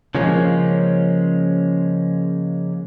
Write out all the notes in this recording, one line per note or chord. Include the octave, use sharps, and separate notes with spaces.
C#3 F3 G#3 A#3 C#4